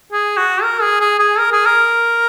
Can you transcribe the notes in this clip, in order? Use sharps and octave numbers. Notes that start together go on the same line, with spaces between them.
G#4
F#4
A#4
G#4
G#4
G#4
A#4
G#4
A#4